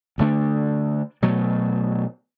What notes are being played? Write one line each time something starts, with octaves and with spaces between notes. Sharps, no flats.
D2 D3 A3 D4
B2 F#3 A3